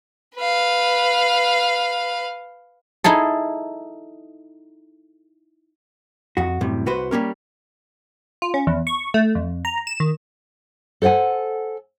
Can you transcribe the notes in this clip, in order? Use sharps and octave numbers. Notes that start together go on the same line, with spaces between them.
B4 F5
D#4 E4 G#4 A4
F2 F#4
F#2 A2 C3 G3
C2 F#4 B4 C5
G3 A#3 C#4 A#4
F4
C#4
E2
C#6
A3
F2
A#5
E7
D#3
A4 C5 D5 F#5 G#5